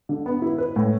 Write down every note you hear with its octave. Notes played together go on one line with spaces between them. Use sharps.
D3
B3
E4
B4
A2